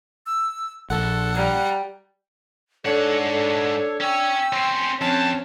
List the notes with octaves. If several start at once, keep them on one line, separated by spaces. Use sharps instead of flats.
E6
A#1 A4 F#5
G3 A#5
G#2 D4 A4 C#5 F#5
A4
C#4 C#5 G5 E6
C4 C#4 C6
F2 C4 C#4 A5